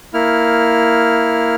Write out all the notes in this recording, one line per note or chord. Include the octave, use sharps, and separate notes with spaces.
A#3 E4 F6